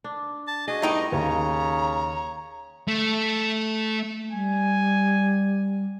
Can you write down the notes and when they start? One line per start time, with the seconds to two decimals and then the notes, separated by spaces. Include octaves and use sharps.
0.04 D4
0.47 A5
0.68 F#4 G#4 D#5
0.82 A2 G3 A3 B3 D#4 G5
1.12 D#2 C#3 C#5 A#5
2.88 A3
4.32 G3 G#5